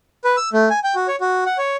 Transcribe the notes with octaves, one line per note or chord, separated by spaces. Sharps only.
B4
E6
A3
G#5
G5
F#4
C#5
F#4
F#5
C#5